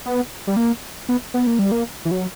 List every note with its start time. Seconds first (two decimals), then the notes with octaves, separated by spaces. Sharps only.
0.06 B3
0.47 G3
0.57 A#3
1.09 B3
1.34 B3
1.47 A#3
1.59 G3
1.72 A#3
2.05 E3
2.11 F#3